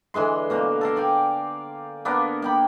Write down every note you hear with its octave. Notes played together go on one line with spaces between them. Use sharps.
D3 E3 G#3 C6
B2 A#3 F5
A4 A#4 F5
D5 G5 G#5
A#3 B3 D4 A#4
A#3 G5 B5